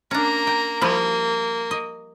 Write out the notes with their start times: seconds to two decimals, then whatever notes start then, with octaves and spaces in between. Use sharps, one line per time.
0.11 A#3 C#4 D4 A#5
0.47 G5
0.81 F3 G3 A#3 E4
1.71 D#5